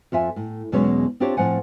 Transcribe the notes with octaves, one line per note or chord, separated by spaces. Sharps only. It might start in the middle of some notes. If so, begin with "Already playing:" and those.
F2 F4 E5 G#5
A2
E2 B2 F#3 G#3 C#4 C#5
C4 D4 F4 G4 C5 C#5
A2 F3 C4 F#5 G#5